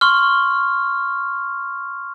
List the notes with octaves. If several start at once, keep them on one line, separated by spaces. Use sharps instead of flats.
C6 C#6 F6